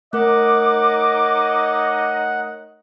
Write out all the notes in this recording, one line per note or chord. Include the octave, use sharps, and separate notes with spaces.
A3 D#4 A#4 C#5 D#5 F#5 D6